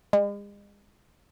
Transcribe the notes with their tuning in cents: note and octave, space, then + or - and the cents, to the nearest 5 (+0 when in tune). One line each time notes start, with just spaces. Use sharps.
G#3 -40